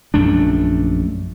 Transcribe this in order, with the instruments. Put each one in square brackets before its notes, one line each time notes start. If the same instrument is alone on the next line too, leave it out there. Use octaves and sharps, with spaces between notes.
[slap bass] A#1 F#2 A3 D4